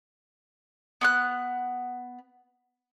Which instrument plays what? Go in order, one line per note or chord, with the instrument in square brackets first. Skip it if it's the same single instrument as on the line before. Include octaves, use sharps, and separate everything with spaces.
[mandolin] B3 C#6 F#6